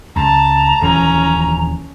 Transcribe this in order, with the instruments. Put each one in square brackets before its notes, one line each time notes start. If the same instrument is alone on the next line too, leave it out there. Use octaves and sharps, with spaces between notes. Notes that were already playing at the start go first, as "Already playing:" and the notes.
[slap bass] C#2 [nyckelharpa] A5 [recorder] A#5
[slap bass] D#1 E3 F3 [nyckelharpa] C#4